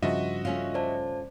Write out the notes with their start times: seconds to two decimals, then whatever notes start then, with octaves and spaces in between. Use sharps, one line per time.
0.02 G2 C#3 F3 F#4 D#5 E5
0.45 A3 C#4 F4
0.74 C5 D5 A5